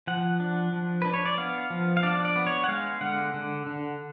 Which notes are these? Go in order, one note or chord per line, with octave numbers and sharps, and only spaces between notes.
F3 F#5
D4
F3
D4 B4
C#5
D5
B3 F5
F3
F5
D4 D5
D5
B3
C#5
F#5
G#3 F5
D3 F#5
D3
D3